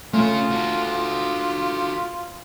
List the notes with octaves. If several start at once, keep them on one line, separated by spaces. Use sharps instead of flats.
A3 C#4 F4 G#4
F#4 A4
F4